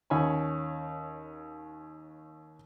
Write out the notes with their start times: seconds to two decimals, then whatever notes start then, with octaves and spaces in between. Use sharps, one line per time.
0.10 D#2 C#4 G#5 B5